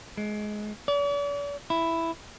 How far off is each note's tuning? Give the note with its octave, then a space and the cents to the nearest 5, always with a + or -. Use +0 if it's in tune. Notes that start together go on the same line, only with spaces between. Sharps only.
G#3 +20
D5 -45
E4 +5